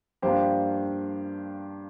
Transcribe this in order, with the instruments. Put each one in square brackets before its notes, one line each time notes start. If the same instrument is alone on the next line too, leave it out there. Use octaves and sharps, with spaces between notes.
[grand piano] G2 F3 A#3 D4 G4 C5